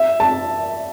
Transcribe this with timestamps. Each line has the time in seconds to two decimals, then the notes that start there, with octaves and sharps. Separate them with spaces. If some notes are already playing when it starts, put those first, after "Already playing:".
Already playing: E5
0.20 A5